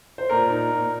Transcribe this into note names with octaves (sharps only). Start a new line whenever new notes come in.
C5
A#2 A#4
D#4
A#2